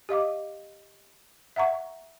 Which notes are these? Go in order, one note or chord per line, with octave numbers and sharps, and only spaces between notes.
G4 D#5 F5 D6
E5 F#5 A#5 C#6